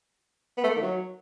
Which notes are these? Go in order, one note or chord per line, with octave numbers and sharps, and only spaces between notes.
B3
A3
A#3
D#3
F#3